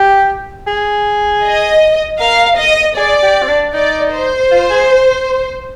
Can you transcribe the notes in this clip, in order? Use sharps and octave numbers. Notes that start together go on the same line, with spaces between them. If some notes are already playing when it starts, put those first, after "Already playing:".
Already playing: G4
G#4
D#5
A#4 F5
D#5
G#4 D5
G4
C4
D4
D#4 D5
C5
F4
G#4